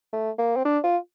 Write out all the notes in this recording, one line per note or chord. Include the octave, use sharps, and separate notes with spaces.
A3
A#3
C4
D4
F4